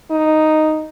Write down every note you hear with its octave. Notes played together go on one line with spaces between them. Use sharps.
D#4